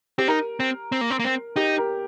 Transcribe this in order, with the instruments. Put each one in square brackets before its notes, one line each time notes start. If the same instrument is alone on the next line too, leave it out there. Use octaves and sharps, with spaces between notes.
[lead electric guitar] C4 [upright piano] G4
[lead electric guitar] D#4 [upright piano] A#4
[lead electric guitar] C4
C4
A#3
C4
A#3
C4
[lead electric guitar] D#4 [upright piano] G4
[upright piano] A#4